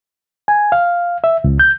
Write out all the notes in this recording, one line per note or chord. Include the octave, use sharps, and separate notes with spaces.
G#5
F5
E5
C#2
G6